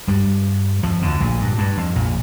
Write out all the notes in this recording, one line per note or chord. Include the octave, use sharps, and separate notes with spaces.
G2 G3
F2 F3
D2 D3
A#1 A#2
G2
G2
F2
A#1 A#2